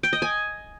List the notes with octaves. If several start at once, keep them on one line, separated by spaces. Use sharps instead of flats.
G5
D#5
G#5